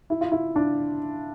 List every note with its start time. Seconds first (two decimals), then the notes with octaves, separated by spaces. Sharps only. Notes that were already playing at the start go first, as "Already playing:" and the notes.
0.10 E4
0.21 F4
0.32 E4
0.56 D4